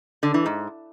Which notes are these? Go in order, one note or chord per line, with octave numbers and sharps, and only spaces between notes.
D3
E3
G#2